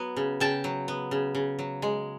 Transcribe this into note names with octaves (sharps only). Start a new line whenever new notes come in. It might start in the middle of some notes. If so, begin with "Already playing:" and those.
Already playing: F#3 B3
C#3
C#3 G5 A5
F#3
B3
C#3
C#3
F#3
G#3